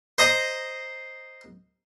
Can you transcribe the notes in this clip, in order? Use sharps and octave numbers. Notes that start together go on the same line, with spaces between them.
C5 D#5 A#5